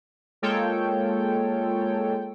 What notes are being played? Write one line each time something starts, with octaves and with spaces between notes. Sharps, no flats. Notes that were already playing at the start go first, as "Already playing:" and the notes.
G#3 A#3 F4 A4 C#5 G5